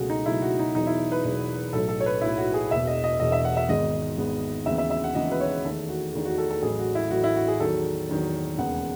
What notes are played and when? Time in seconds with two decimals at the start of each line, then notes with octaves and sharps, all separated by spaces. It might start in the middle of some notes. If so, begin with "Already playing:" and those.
Already playing: C#2 B2 F#3 A3 F#4 G#4
0.10 D#4
0.26 C#2 B2 F#3 A3 E4
0.42 F#4
0.59 D#4
0.75 E1 E2 B2 F#3 D#4
0.87 E4
1.12 B4
1.24 E1 E2 B2 F#3
1.73 B1 A2 F#3 A4
1.89 A4
2.00 C#5
2.06 B4
2.21 B1 A2 F#3 E4
2.38 F#4
2.54 G#4
2.71 E1 E2 B2 E5
2.87 D#5
3.04 D#5
3.20 E1 E2 B2 D#5
3.32 E5
3.45 F#5
3.57 E5
3.69 G#1 G#2 D#3 G#3 B3 D#5
4.18 G#1 G#2 D#3 G#3 B3
4.66 D#2 C#3 E3 G#3 B3 E5
4.78 E5
4.90 E5
5.04 F#5
5.15 D#2 C#3 E3 G#3 B3 D#5
5.32 B4
5.41 C#5
5.65 E2 D#3 A3 A4
5.89 F#4
6.14 E2 D#3 A3
6.26 F#4
6.38 A4
6.50 A4
6.62 A1 A2 F#3 G#4
6.79 F#4
6.95 E4
7.11 A1 A2 F#3 F#4
7.24 E4
7.36 F#4
7.48 G#4
7.60 E2 D#3 F#3 A4
8.09 E2 D#3 F#3
8.58 E1 D#2 C#3 G#3 B3 F#5